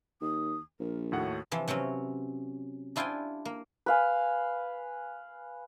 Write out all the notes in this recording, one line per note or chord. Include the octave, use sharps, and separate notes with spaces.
D#2 D#6
A#1 A#4
D#2 A2 F#4 F#5
C3 E3 F3
C3 F#3 C4 C#4
D4 E4 F4 G4 G5 G#5
A#3
B4 F5 G#5